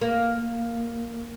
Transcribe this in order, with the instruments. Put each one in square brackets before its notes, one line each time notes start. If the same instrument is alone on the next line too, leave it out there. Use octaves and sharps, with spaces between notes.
[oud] A#3